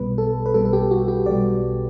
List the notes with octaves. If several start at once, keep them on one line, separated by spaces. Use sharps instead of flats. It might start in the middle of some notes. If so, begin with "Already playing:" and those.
Already playing: B1 B2 G3 B4
A4
B4
B1 B2 G3 A4
A4
G4
F#4
G4
B1 B2 G3 D5